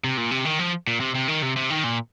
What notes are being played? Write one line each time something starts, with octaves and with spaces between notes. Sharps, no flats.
C3
A#2
C3
D#3
F3
A#2
C3
C3
D#3
C3
C3
D#3
A#2